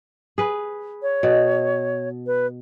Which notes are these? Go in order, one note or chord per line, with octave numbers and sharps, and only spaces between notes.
G#4 B4
C#5
B2
B4